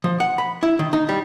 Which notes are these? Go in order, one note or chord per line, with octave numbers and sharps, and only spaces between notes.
F3
F#5
B5
E4
D#3
D#4
G3